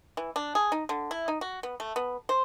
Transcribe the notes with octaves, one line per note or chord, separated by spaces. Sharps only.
E3
D4
G#4
D#4
D3
E4
D#4
F#4
B3
A3
B3
C5